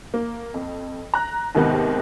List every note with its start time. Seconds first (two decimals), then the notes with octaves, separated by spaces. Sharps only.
0.14 A#3
0.54 F2
1.14 A#5 F#6
1.55 D#2 G#2 C3 D#3 B3